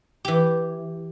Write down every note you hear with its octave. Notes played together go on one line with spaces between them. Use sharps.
E3 G4